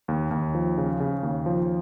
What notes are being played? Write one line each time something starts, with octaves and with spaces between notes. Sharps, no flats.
D#2
D#2
F3
C#3
C#3
D#2
F3